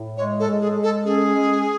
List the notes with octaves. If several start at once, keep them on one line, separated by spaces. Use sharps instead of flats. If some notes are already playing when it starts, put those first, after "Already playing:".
Already playing: A2
G#3 C#5
A4
G#3
G#4
G#3
A4
C#4 G#4
G#3